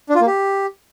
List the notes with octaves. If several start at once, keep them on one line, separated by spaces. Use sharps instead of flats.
D4
F4
A#3
G4